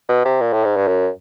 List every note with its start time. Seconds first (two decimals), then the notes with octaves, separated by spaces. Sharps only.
0.09 B2
0.25 C3
0.41 A#2
0.53 A2
0.65 G#2
0.77 G2
0.88 F#2